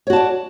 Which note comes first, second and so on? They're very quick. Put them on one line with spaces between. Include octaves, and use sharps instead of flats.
C#5 F#4 A5 D5